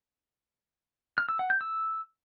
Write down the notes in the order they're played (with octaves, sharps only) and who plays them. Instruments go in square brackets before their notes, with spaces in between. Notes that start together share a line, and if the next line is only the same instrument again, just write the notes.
[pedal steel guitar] F6
E6
F#5
G6
E6